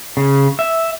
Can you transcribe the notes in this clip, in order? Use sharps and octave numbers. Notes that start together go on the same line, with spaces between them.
C#3
E5